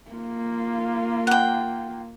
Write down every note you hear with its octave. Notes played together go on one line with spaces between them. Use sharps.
A#3 F4
F#5 G5